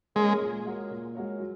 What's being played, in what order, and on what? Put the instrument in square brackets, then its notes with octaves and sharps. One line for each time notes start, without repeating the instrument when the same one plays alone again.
[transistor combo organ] G#3 [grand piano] A#3 C#4 A#4 C#5
[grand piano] A#2
G#3 F#4 A#4 C#5
A#2
G#3 F#4 A#4 C#5
F#3